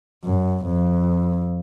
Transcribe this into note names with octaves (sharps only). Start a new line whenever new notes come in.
F#2
F2